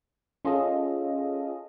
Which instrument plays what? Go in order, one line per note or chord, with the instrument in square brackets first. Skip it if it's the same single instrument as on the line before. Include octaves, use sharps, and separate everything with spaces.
[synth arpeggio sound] C#4 F4 G#4 A4 D#5